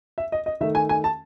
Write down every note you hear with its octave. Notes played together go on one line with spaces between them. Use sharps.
E5
D#5
D#5
D#3 A3 E5
G#5
G#5
A5